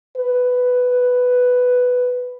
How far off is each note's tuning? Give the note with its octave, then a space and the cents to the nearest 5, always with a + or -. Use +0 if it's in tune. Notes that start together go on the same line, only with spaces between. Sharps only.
B4 +5